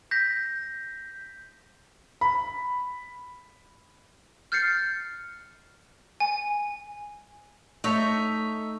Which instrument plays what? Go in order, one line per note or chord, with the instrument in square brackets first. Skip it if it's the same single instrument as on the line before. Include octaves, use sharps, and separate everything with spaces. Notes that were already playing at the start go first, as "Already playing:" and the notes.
[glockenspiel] G6 A#6 B6
[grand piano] B5
[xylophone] F6 G6 A6 C7 C#7
G#5
[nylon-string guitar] A3 [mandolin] D#4 C#5 E5